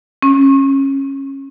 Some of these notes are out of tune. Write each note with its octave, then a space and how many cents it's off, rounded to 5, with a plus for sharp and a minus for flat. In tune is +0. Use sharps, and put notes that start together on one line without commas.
C#4 -20